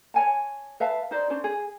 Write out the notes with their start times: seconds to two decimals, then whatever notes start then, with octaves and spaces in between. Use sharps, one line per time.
0.14 C#5 G#5 A5
0.80 B4 E5 F5 A5
1.11 D#4 C5 D5
1.30 C#4 D4 C5
1.44 G#4